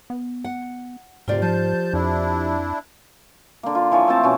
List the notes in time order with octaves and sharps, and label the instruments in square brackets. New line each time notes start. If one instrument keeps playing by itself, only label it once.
[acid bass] B3
[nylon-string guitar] F#5
[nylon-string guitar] D2 C3 D5 [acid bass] G#2 [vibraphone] F4 G4 C5
[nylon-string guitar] F3 [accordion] A5 G6
[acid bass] F2 [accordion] D4 E4
[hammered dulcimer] D3 A#3
F4
E3 F3 C#5
A3 C4 A5
B2 C#4